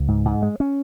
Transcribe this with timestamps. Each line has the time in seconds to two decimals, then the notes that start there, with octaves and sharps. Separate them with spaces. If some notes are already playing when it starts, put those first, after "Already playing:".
Already playing: C#2
0.08 G#2
0.25 G#2
0.42 G#3
0.60 C#4